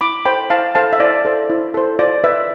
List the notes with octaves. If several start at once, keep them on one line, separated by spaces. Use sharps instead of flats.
E4 B5 D6
A4 C5 G5 B5
E4 F5 A5
A4 C5 F5 A5
E5
E4 D5
A4 C5
E4
A4 C5
F4 D5
B4 E5